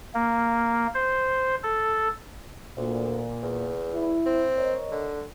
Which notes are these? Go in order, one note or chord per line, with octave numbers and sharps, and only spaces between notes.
A#3
C5
A4
D2 A#2
E2
E4
C4
A#4 C#5 D#5
D3